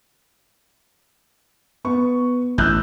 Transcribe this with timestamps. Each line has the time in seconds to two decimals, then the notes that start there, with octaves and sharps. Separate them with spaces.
1.85 B3 C#6
2.58 A1 E6 F#6 G6